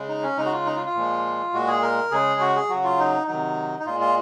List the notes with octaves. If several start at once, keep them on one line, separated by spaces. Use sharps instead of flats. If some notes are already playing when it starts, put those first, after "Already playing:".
Already playing: C#3 G#3
D#4
C#4
C#3 G#3 D#4
F#4
F4
D#4
F4
F4
A#2 F3 G#3
A#2 G#3 F#4
G#4
A#4
C#3 G#3 G#4
F#4
G#4
C#3 F#3 F#4
F4
D#4
C3 D#3 F#3 D#4
D#4
A#2 G#3 F4
F4